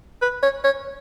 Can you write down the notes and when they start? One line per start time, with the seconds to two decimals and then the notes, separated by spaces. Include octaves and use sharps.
0.22 B4
0.43 C#5
0.64 C#5